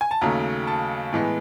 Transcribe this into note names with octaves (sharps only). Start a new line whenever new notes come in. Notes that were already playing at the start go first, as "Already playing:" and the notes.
G#5
A5
D#2 C#3 F#3 A3 A#5
A5
A2 E3 G#3 B3